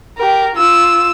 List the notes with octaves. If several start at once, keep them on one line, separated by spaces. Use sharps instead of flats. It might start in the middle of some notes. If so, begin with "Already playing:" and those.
G4 A#4
F4 E6